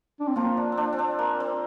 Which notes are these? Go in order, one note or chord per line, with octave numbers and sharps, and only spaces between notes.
D4
C4
F3 A#3 F4
D4
C4
D4
C4
D4
A#3
C4